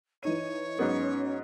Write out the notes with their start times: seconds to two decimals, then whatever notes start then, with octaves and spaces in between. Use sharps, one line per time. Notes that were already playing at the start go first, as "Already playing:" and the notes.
0.23 E3 D#4 C#5 D#7
0.79 G#2 F#3 B3 C#4